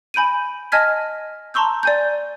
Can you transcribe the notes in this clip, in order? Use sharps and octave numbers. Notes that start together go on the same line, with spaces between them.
G#5 B5 G6 D7 D#7
D#5 G#5 A5 F6 G#6 B6
A5 A#5 C6 C#6 E6 G6
D5 G#5 G6